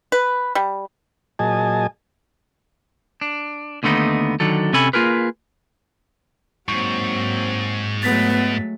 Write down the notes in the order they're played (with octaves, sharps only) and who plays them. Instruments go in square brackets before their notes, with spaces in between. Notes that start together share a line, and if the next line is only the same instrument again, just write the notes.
[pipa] B4
G3
[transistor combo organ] A#2 F#3 G#4 D#5 G#5 A5
[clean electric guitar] D4
D#2 D3 A3 B3 D#4
D3 D#3 F#3 A4
C3 C#4 A4 G#5 B5
A#3 F4 G#4 A#4 B4
[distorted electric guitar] G#2 [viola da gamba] F#3 A#3 C4 [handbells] C#6
[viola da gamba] F#3 G#3 A3 [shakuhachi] B3 [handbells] A6 B6